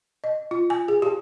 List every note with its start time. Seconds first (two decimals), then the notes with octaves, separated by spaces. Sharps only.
0.24 D#5
0.51 F4
0.70 G#5
0.88 G#4
1.02 G4